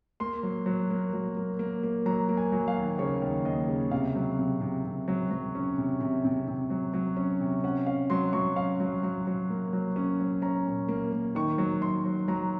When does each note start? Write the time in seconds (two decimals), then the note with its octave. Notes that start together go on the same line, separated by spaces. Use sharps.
0.20 A#3 C6
0.43 F#3
0.66 F#3
0.90 A#3
1.13 F#3
1.37 A#3
1.59 A#3
1.83 A#3
2.06 F#3 A#5
2.29 A#3
2.37 G#5
2.52 F#3
2.68 F5
2.76 D#2
2.99 C#3 C#5
3.22 D#2
3.45 D#2 D#5
3.69 C#3
3.91 C3 F5
4.16 F#3
4.38 C3
4.61 C3
4.84 C3
5.08 F#3
5.31 F#3
5.55 C#4
5.78 C3
6.01 C3
6.25 C3
6.48 C3
6.70 F#3
6.94 F#3
7.17 C#4
7.40 C3
7.64 C#4 F#5
7.86 C#4 F5
8.10 F#3 C6
8.33 F#3 C#6
8.56 C#4 F5
8.80 F#3
9.03 F#3
9.27 F#3
9.50 A#3
9.73 F#3
9.96 C#4
10.20 F#3
10.42 C#4 A#5
10.66 A#2
10.88 A#3
11.12 A#3
11.35 D#3 C#6
11.58 F#3
11.82 F#3 C6
12.05 F#3
12.28 F#3 A#5